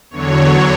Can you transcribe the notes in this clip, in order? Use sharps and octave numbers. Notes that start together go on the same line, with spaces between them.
E2 D3 F#3 C#5